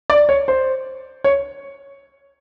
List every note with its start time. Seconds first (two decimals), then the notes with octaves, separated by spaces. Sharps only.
0.10 D5
0.29 C#5
0.48 C5
1.24 C#5